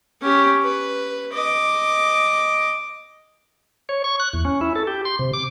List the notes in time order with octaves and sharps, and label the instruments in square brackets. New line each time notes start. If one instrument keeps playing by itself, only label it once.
[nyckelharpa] C#4 G4
B4
D#5 D6
[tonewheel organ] C#5
C#6
F#6
E2
C#4
E4
A4
G4
C6
C3
D6